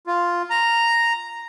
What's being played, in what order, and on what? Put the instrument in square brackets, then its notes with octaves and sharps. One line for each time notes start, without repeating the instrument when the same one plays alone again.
[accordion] F4
A#5